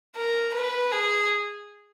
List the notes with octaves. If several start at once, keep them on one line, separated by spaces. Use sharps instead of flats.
A#4
B4
G#4